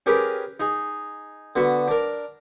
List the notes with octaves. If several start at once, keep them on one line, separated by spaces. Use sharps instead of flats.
C#4 G4 G#4 A#4 B4
D#4 G#4
D3 B3 F#4
D4 A#4